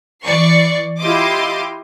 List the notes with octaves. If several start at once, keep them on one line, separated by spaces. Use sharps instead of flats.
E3 D5 C#6 C7
E4 F4 G4 D#5 C6 D6